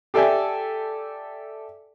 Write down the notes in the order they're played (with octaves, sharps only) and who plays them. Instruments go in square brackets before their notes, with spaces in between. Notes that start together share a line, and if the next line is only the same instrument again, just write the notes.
[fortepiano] G4 A4 D5 E5 G5 G#5